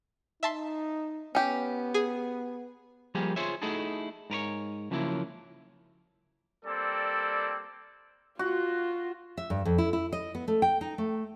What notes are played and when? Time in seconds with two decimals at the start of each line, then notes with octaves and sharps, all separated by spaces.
0.43 D#4 E5 A5 C6
1.35 B3 C#4 G4
1.94 G#4
3.15 F3 G3 A#3 G4 G#4 A#4
3.36 F4 G#4 C5 C#5 E5
3.62 A3 D#4 E4 F#4 G#4 A4
4.30 G#2 A#4 B4 C#5
4.91 C#3 F3 F#3 A#3 E4
6.65 G3 A#3 C4 A4 D5
8.39 F4 F#4
9.37 E5
9.50 G2
9.65 F2
9.78 E4
9.93 E4
10.13 D#5
10.35 B3
10.48 A3
10.62 G5
10.81 D#4
10.98 A3